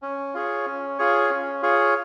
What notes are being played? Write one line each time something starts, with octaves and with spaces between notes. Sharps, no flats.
C#4
F4 G#4 C#5
C#4
F4 G#4 C#5
C#4
F4 G#4 C#5